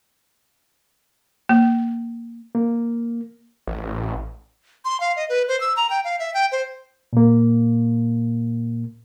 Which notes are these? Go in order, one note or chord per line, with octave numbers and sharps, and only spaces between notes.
A#3
A#3
A1
C6
F5
D#5
B4
C5
E6
A#5
G5
F5
E5
G5
C5
A#2 A#3